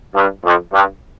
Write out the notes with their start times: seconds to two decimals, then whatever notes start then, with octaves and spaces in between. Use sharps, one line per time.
0.15 G2
0.44 F2
0.73 G2